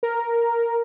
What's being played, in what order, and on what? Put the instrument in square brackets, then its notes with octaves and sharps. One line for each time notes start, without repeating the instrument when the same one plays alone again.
[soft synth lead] A#4